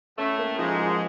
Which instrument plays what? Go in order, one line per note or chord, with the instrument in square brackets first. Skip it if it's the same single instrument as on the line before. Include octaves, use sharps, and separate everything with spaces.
[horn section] A2 A3 [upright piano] C#4
[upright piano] A#3
[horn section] G#2 G#3 [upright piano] F3
[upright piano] F3